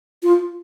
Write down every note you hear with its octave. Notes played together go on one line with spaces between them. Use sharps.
F4